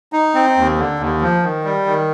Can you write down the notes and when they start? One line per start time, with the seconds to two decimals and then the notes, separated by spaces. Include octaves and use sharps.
0.13 D#4
0.34 C4
0.57 D#2
0.78 D3
1.00 D#2
1.21 F3
1.43 D#3
1.64 G3
1.86 D#3